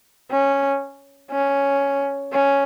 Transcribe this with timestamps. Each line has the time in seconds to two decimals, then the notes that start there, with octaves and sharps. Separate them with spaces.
0.30 C#4
1.31 C#4
2.32 C#4